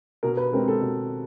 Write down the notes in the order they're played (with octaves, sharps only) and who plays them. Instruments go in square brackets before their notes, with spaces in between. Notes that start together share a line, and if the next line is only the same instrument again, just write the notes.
[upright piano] B2 A#4
B4
G#3 C4 A#4
A4
B2